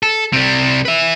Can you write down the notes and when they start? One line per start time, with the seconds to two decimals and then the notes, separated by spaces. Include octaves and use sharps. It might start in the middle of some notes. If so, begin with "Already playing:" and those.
0.03 A4
0.33 C3 G3
0.85 B4 E5